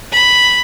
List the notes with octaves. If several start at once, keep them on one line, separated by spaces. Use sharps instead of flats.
B5